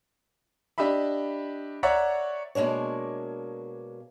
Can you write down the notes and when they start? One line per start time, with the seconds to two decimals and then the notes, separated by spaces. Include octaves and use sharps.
0.78 D4 G4 D#5 E5 B5
1.83 C#5 D5 E5 F#5 A#5 C#6
2.55 B2 G#3 A#3 D4 C#5